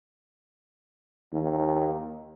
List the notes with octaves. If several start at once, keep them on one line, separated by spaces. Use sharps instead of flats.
D#2